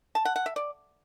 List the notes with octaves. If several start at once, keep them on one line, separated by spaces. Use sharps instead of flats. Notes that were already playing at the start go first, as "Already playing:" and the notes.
A5
F#5
F#5
E5
D5